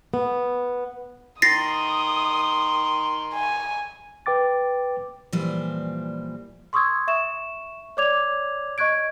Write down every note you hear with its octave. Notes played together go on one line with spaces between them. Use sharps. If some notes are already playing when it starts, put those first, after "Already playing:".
B3
D#3 C6 D#6 A6 A#6 C7
G#5
B4 G5 D6 A6
A#2 E3 F3 G3
C6 C#6 D#6 E6 G#6
E5 C#6 E7
C#5 D5 D6 G#6 F7
D#5 C#6 F#6 G#6 D7